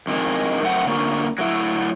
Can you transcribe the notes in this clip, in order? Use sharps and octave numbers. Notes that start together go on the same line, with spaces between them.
F2 D#3 G#3
F#2 A3 C4 F#5
D3 A#3 C#4 F4
F#3 A3 E4